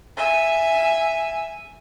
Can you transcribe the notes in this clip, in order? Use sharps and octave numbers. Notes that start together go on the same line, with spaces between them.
E5 G#5